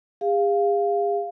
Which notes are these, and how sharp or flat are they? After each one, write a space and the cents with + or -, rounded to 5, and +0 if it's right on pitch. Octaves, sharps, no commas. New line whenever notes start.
G#4 -40 F5 +0